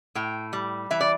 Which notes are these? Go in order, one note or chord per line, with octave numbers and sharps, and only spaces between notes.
A2 G5
G3
E3 E5
D5